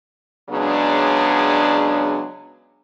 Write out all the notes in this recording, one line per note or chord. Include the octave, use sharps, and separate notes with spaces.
C#3 F#3 G#3 B3 D4